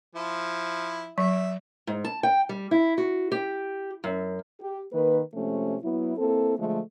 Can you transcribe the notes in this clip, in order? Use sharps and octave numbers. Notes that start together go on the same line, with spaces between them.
F3 E4
F#3 E5
G#2
A5
G5
G3
E4
F#4
G4
F#2
G4
D#3 A#3 B4
C3 F3 G#3 A3 C#4
F#3 B3 E4
A#3 C4 E4 A4
D3 F3 G#3 A3